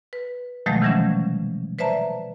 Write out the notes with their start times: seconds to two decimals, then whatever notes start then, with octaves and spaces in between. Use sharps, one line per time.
0.13 B4
0.66 B2 D#3 F3 F#3 G#3 A3
0.82 C3 D#3 E3 F#3 G3 C#4
1.79 B4 C5 D5 E5 A5 A#5